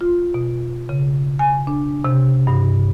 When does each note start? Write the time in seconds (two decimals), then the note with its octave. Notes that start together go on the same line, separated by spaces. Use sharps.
0.01 F4
0.34 B2
0.89 C#3
1.39 G#5
1.67 D4
2.04 C3
2.47 G2